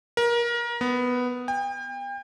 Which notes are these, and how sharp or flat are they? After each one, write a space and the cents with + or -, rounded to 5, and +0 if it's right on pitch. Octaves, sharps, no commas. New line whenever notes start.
A#4 +25
B3 +5
G5 +35